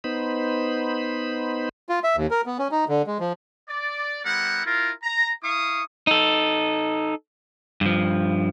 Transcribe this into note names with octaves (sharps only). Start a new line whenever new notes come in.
B3 D#4 C5 B5
F4
E5
D#2
A#4
B3
C#4
D#4
D3
G#3
F3
D5
G3 B3 E4 A#4 C5 F#5
E4 F4 A#4
A#5
E4 F5 C#6 D#6
D#4 A4
G2 F3